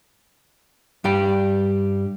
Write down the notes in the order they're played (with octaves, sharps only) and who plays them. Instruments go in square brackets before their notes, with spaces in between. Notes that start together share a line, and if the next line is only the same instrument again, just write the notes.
[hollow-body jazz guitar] G2 G3 G5